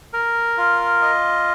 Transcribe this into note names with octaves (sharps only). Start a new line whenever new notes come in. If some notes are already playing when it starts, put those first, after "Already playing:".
A#4
F4
D#5